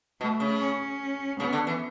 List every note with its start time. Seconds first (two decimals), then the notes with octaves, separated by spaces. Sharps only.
0.20 B2 A3
0.40 C#3
0.61 C#4
1.39 C#3 B3
1.53 D3
1.67 E3